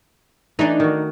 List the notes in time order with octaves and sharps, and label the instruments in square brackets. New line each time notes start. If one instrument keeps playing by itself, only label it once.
[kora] E3 A3 [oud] D4 D#4
[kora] D#3 F#4